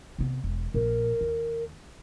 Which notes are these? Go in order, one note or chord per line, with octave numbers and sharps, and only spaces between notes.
C3 B3
E1
A#1 A#4
D#2